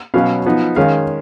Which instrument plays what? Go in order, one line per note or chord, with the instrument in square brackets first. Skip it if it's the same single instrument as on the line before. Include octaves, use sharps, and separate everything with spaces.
[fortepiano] B2 F#3 C#4 F5
F3 B3 D#4
D#3 G#3 C#4 F5